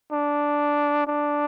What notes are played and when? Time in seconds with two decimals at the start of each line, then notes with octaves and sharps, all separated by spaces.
0.12 D4
1.07 D4